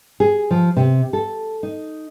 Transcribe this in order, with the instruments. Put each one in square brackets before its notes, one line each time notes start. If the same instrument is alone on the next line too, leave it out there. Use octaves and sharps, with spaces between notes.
[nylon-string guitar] G#4
F3
C3
A4
D#4